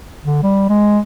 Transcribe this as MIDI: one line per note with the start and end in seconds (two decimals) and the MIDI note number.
0.25 0.40 50
0.43 0.69 55
0.69 1.00 56